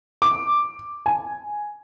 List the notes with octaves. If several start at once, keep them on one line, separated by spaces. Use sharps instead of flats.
D6
G#5